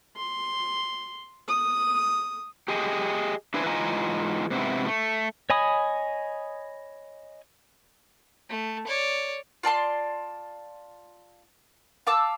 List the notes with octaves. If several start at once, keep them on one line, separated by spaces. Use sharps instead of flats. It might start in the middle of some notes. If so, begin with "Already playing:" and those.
C6
D#6
G4 G#4 D#5
D4 E4 B4 C5 E5 G#5
G#2 E3 F4 D#5 G#5 A#5
G#2 C3 B3 E4
A3
C#5 D#5 G#5 B5 D#6
A3
C#5 D5
F4 D5 A5 C6
F5 A5 D6 E6